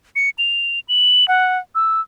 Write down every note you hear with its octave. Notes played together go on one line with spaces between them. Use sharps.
C#7
F7
F#7
F#5
E6